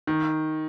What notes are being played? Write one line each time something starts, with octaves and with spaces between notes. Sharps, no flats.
D#3